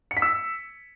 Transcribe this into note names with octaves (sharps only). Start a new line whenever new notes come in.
C#7
B6
E6